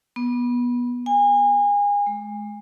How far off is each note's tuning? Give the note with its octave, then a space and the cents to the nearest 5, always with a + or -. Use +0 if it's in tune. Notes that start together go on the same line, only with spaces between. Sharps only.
B3 -20
G#5 -30
G#3 +30